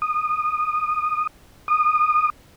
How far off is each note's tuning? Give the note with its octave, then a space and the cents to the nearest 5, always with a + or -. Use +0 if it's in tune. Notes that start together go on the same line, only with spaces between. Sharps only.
D#6 -20
D#6 -25